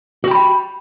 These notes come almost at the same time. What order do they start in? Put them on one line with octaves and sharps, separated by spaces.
F#4 G4 B5 G5